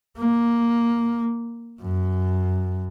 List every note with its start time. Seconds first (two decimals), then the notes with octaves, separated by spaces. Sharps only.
0.18 A#3
1.82 F#2